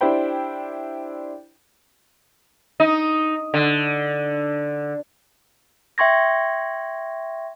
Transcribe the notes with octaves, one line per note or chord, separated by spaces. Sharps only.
D4 E4 G4 C5 G5 B5
D#4
D3
E5 G5 C6 C#6 G#6 A#6